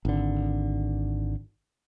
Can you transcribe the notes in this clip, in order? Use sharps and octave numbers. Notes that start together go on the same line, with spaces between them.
G#1 D3